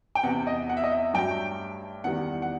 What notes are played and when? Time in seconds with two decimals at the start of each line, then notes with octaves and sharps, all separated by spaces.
0.15 G5
0.23 E2 C3 E3 F#5
0.47 D#5
0.69 F#5
0.77 E5
0.84 D#5
0.91 E5
1.14 G2 F#3 A3 G5
2.04 E2 D#3 G3 F#5
2.42 F#5